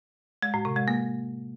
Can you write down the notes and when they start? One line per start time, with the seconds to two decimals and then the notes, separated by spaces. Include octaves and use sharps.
0.42 G#3
0.54 A2
0.65 C3
0.76 G#3
0.88 A#3